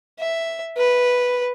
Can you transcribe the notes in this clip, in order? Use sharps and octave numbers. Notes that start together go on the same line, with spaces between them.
E5
B4